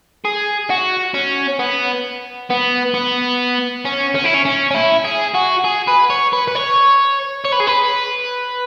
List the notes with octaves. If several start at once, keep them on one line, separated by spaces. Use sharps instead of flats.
G#4
F#4
C#4
B3
B3
B3
C#4
C#4
E4
C#4
C#4
C#4
E4
G#4
F#4
G#4
B4
C#5
B4
B4
C#5
C#5
B4
G#4
B4